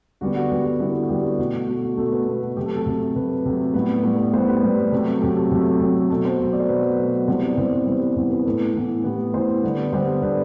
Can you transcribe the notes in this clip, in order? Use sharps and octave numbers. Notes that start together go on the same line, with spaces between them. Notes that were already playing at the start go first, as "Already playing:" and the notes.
D3 G3 B3 F#4
F#4
D3 G3 B3 G4
F#4
D3 G3 B3 E4
F#4
D3 G3 B3 G4
F#4
B2 A3 F#4
F#4
B2 A3 F#4
F#4
B2 A3 A4
B4
B2 A3
F#4
C3 F#3 A3 G4
A4
A4
C3 F#3 A3
C3 F#3 A3 B4
C3 F#3 A3
A2 G3 B3 B4
A2 G3 B3
A2 G3 B3 C5
B4
A2 G3 B3
C3 F#3 A3
C3 F#3 A3 G4
A4
C3 F#3 A3
C3 F#3 A3
B2 F#3 A3 A4
C5
B2 F#3 A3
D5
C5
B2 F#3 A3 B4
B2 F#3 A3
C3 E3 G3 B3 C5
D5
C3 E3 G3 B3 C5
B4
C3 E3 G3 B3 C5
B4
C3 E3 G3 B3
B4
A2 E3 B3 A4
A2 E3 B3
A2 E3 B3 G4
A2 E3 B3 C5
D3 G3 B3
D3 G3 B3 C5
D3 G3 B3 B4